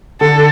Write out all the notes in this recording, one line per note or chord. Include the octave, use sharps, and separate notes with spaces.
D3 A4